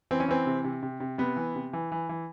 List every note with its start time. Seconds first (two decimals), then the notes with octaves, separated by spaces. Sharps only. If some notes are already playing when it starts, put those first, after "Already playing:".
0.11 E3 C4
0.20 C#4
0.28 E3 C4
0.46 C3
0.64 C3
0.83 C3
1.00 C3
1.18 C3 B3
1.37 E3
1.55 C3
1.73 E3
1.92 E3
2.09 E3